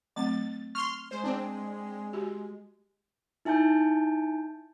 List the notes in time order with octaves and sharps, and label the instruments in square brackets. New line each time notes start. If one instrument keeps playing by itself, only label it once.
[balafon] F#3 A3 C4 [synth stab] A6
[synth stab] C6 F6 [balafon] C#6
[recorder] G#3 [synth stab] C5
[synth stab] C4 D4
[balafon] F#4 G4
[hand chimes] D#4 E4 G#5 A5 G6